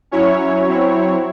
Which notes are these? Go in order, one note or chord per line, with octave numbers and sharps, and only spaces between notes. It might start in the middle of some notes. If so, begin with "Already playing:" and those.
F#3 C#4 E4 C#5
F#3 C4 E4